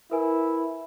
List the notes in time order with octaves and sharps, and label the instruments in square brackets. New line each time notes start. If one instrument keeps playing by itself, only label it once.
[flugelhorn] E4 [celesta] A#4 B4 G#5